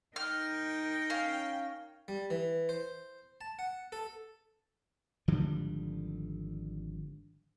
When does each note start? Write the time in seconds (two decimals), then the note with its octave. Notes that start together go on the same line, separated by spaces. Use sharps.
0.16 D#4 A#4 G5 F6
1.10 C#4 F5
2.08 G3
2.30 E3
2.69 C5
3.41 A5
3.59 F#5
3.92 A4
5.28 G#1 D3 F3 G3